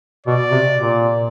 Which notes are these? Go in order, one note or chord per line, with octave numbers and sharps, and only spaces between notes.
B2 D5
C3
A#2